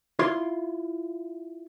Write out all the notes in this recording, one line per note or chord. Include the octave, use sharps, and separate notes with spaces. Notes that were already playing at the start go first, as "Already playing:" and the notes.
E4 F4 C6